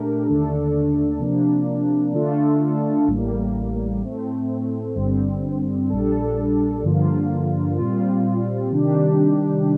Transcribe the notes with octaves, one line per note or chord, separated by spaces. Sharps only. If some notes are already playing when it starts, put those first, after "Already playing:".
Already playing: A#2 A3 D4 G4 A#4
D#2 D3 A3 D4 A4
C3 F3 A#3 D4
D3 A3 D4 F4 A4
A1 A2 G3 A#3
A2 A3 C4
G1 G2 D3 G3 C4
A#1 A#2 G3 D4 A4
G2 D3 F3 A#3 F4
A#2 G3 C4 F4
C3 D#3 G3 D4 G4